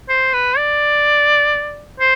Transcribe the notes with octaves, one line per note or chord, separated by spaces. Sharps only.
C5
B4
D5
C5